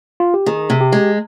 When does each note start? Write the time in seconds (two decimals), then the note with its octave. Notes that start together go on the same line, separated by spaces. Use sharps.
0.20 F4
0.34 G4
0.46 D#3 G#4
0.70 C3
0.81 G4
0.92 G#3